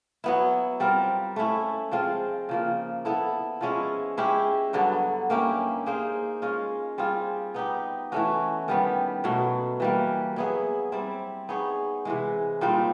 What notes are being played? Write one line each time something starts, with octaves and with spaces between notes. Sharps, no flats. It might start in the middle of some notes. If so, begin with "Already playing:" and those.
F#3 B3 E4
G3 C4 F4 A#4
A3 C#4 E4
F3 G#3 C4 F4
C#3 F3 A#3
B3 E4 A4
F3 G#3 C#4 E4
G#3 C#4 E4 G4
G2 D3 F#3 B3
A#3 C#4 E4 G4
A#3 D#4 G#4 C5
G#3 C#4 F4
G3 C4 F4 G#4
B3 D#4 G4
E3 A3 C#4 F#4
D#3 G3 B3
B2 F#3 A3
E3 G3 A#3
F#3 B3 E4 G#4
G3 C4 E4
B3 D#4 G#4 C#5
C3 E3 G#3
A#2 G3 C4 D#4